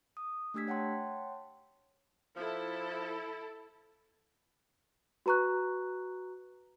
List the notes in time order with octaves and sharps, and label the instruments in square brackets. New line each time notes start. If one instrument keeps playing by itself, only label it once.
[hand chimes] D#6
A3 D4 G4 E6 G#6 B6
C#5 F#5 G5 A5 C6
[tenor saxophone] F3 [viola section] E4 A4
[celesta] F#4 B4 A#5 C#6 F#6